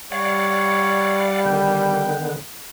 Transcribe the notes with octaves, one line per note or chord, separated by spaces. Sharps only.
G3 C#5 D5 F5 F#5
D3 D#3 B3 G5